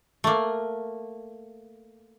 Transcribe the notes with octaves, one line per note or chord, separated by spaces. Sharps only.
A3 A#3